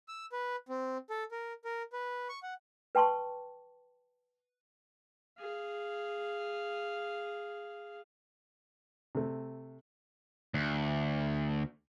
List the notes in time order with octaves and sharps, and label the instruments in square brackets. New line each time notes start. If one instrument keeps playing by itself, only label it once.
[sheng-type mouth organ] E6
B4
C4
A4
A#4
A#4
B4
C#6
F#5
[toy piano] B4 G5 A5 C6 C#6
[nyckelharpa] G#4 F5
[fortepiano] C3 A3
[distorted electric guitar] D2